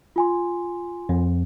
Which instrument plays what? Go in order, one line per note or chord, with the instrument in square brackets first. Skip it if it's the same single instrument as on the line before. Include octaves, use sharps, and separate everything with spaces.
[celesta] F4 G#5 C6
[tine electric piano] F2